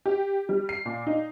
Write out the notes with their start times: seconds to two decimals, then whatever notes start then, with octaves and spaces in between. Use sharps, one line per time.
0.06 G4
0.49 G3
0.69 C7
0.86 A#2
1.07 D#4